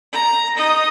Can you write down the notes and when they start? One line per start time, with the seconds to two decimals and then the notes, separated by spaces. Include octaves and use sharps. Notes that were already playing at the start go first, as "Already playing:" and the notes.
0.13 A#5
0.56 D#4 D#5